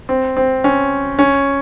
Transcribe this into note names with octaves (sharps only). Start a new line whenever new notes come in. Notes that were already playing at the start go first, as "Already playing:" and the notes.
C4
C4
C#4
C#4